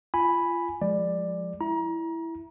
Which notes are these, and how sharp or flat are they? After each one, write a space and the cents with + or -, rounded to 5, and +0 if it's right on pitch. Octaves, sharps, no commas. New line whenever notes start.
F4 -25 G#5 +0 B5 +0
F3 +20 G#3 +0 D5 +10
E4 +0 A#5 +30